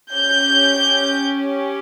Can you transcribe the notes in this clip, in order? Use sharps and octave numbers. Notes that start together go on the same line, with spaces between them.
C#4 G4 G6